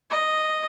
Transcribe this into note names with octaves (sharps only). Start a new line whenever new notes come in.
D#5